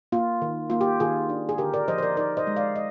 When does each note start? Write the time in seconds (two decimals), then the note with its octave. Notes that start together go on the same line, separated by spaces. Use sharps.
0.12 A#3 F4
0.42 D#3
0.70 A#3 F4
0.81 G4
1.00 D#3 F4 G#4
1.29 D4
1.49 G#4
1.58 D3 G4 A#4
1.74 A#4 D5
1.88 F3 C5 D#5
1.98 C5
2.03 A#4 D5
2.17 D#4 A#4 D5
2.37 C5 D#5
2.47 G#3
2.56 D5 F5
2.76 D#5